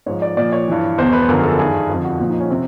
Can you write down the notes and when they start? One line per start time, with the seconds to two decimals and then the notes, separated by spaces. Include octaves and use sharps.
0.06 G#2 F3 C#5
0.22 D5
0.37 A#2 F3 D5
0.52 C#5
0.68 G2 E3
0.98 E2 B2 C5
1.13 B4
1.28 F#2 D3 F3 A#4
1.39 G#4
1.43 A4
1.59 G2 D#3 G#4
1.90 F2 D3 F3
2.04 F#4
2.20 A#2 F3
2.30 D#4
2.40 C#4
2.50 C3 C4